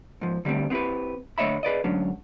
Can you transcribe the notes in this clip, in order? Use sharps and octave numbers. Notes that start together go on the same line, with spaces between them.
G#2 F3
D3 G3 A3 C4
B3 C4 E4 G4 B4
D3 A3 C#5 D#5 E5 B5
G#4 B4 D5 D#5
D2 G#2 F#3 C#4 D4